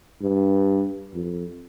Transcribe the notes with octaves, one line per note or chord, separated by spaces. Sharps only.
G2
F2